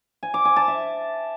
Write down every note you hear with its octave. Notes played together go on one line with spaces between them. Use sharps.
G#5
D6
G#5
A5
E5